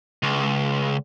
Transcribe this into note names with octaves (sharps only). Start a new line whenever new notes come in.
C#2